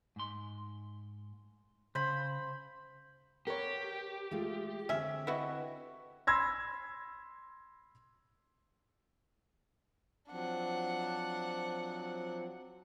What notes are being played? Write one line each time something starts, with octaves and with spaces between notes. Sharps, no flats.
G#2 C6
C#3 C5 B5
G4 A#4 B4 C#5 F#5
G#3 A3 F4
D3 C4 C#4 G4 E5
E4 F#4 B4 D#5
B5 C6 E6 G#6 A#6
F3 F#3 C4 D4 F#5